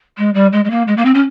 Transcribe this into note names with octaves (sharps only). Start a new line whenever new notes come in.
G#3
G3
G#3
G#3
A#3
G#3
A#3
C4
C#4